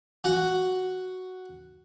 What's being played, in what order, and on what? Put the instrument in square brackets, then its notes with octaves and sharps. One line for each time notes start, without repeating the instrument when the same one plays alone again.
[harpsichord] F#4 F#5